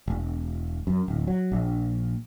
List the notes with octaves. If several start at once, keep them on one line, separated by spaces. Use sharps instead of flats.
E1
F#2
D1
F#3
A#1